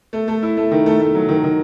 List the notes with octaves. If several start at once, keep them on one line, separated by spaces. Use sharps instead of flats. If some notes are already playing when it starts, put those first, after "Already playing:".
A3
A3
E4
A3
D#3
A3
A3
F#3
D#3
D#3